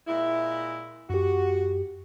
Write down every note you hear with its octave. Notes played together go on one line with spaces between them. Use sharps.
A#2 G#3 E4
F#2 F#4 G4